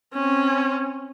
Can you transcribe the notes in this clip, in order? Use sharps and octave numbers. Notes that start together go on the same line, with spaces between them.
C4 C#4